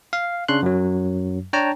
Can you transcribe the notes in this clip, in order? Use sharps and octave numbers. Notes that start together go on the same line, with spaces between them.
F5
C#3 D4 C6 F#6
F#2 F#3
D4 C#5 G5 A5 A#5